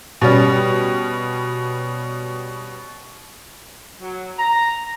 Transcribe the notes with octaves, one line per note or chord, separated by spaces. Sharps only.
B2 G3 C#4 G4
F#3
A#5